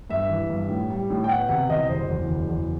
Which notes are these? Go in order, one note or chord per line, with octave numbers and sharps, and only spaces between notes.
G2 E5
E3
G2
A2
G3
A2
G5
B3 F#5
C3 F#5
C2 D#5
F#1 C5
E2
F#1
E2